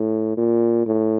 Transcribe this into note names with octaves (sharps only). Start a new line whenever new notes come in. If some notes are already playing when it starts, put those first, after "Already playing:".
Already playing: A2
A#2
A2